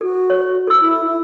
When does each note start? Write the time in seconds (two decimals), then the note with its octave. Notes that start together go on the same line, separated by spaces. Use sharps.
0.01 F#4 A4
0.30 C#5
0.67 A4 E6
0.81 E4
1.06 E4